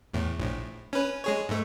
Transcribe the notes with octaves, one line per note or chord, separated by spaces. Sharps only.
E2 A2
A#1 A2
C#4 B4
G#3 G#4 C#5
G#2 A3